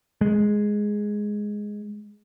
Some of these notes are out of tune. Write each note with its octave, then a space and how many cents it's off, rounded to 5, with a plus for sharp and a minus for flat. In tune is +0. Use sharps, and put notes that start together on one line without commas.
G#3 +0